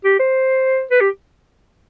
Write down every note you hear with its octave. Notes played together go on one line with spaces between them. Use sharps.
G4
C5
B4
G4